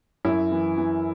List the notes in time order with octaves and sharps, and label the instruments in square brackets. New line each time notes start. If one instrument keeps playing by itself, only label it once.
[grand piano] F#2 E4
E3
E3